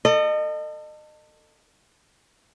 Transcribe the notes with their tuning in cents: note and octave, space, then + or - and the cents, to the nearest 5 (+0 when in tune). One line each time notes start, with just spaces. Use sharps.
A4 +30 D#5 -30